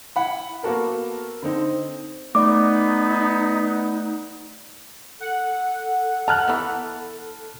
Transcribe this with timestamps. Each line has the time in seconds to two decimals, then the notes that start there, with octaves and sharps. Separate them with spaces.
0.16 E4 F#5 B5
0.63 A#3 B3 F#4 A4 A#4
1.43 D3 C4 D#4
2.35 A3 B3 D#4 D5 D6
5.20 A4 F#5
6.28 A5 A#5 F6 F#6
6.48 E3 B3